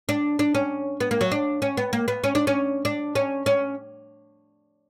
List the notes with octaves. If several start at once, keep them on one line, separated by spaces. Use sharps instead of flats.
D4
D4
C#4
B3
A#3
F#3
D4
C#4
B3
A#3
B3
C#4
D4
C#4
D4
C#4
C#4